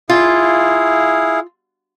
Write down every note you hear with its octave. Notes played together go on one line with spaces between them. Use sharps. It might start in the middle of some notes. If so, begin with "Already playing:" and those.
E4 F4 G#4 F5